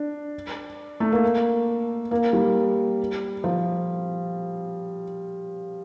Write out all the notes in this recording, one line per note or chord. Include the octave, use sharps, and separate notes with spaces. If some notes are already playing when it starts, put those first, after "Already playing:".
Already playing: D4
A3
A#3
A#3
G3
F3